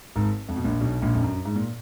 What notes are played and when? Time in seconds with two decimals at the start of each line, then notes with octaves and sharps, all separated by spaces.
0.15 G#1 G#2
0.49 F2
0.56 B2
0.64 A#1 A#2
0.80 B1 B2
1.02 A#1 A#2
1.14 F2
1.23 F#2
1.45 G#2
1.56 A#2